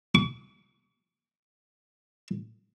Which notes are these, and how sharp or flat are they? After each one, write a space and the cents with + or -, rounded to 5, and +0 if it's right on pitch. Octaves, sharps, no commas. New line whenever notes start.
C#6 +45